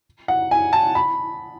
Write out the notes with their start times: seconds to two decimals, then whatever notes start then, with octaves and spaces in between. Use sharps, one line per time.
0.28 F#5
0.51 G#5
0.73 A5
0.95 B5